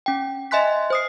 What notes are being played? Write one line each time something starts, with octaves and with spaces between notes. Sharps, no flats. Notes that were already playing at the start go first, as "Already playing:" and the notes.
C#4 G5
D#5 E5 G#5 C6 F#6 B6
C5 D#6 C7